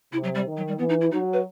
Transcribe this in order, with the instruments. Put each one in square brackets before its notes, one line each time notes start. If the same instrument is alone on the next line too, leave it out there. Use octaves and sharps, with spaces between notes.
[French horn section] C3 [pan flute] E4
[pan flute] F#3
G3
[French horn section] D#3
[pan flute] F#3
G3
[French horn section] E3 [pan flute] B3
[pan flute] D#4
E4
[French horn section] F#3 [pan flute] D#4
[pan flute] B4